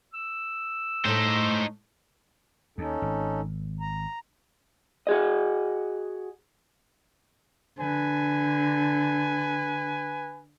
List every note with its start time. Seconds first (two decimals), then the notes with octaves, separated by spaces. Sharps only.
0.14 E6
1.06 A2 A3 D#4 C5
2.78 D#2 C#4 D#4 A4
3.02 G#1
3.81 A#5
5.07 F#4 G#4 D#5
7.79 D3 B4 G#5